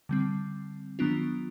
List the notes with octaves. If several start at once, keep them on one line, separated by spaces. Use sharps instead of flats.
D3 G3 C4
D#3 F#3 B3 D4 F4